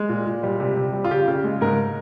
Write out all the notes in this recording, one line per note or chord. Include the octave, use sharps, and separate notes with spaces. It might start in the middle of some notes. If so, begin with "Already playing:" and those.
Already playing: G#3
A#2
A#2
G3
C3
C3
G3
F4
C#3 G4
C#3
G#3
G#2 A#4